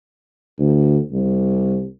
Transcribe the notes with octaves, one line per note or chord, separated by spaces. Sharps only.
D2
C2